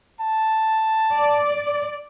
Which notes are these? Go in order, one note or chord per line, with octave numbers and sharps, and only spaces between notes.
A5
D5